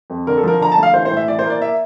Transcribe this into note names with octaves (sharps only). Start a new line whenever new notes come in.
F2
D3 A#4
A4
F3 A#4
D3 A#5
A5
A3
F5
E3 C5
C5
A2
E5
E3 D5
C5
A#3
D5
E5